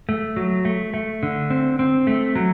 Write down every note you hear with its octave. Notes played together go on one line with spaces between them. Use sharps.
A3
F#3
A3
A3
D3
C4
C4
A3
F#3